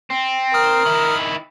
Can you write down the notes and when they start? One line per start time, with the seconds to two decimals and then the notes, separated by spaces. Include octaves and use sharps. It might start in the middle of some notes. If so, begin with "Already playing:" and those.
0.10 C4
0.54 A#4 D#6 F6
0.85 D#3 E4